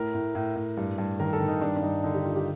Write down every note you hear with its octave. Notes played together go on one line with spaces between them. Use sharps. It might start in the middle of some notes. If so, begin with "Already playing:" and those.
Already playing: A2 A#4
A2
A2
A2
G2
G2
D#3 A#4
A4
D#3
D#4
G2 D4
D4
G2 D#4
D3 D#4
G4
D3 F4
G4